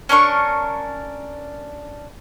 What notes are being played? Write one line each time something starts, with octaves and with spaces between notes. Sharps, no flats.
C#4 D4 A#4 C#6